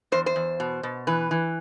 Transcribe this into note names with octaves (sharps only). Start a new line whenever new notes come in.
E2 C5
C5
E2
B2
B2
E3 B4
E3